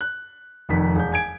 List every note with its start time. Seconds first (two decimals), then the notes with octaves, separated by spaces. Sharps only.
0.01 F#6
0.69 F1 F2 D#3 B6
0.95 E1 G6
1.12 G#5 G#6 D7